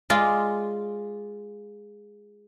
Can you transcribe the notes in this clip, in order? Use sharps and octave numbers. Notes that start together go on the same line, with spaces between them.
G#3 F4 D5